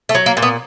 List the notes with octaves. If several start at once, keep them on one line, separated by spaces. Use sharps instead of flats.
A3
F#3
A#3
A#2
B3